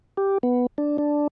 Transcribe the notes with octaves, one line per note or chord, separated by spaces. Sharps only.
G4
B3
D4
D4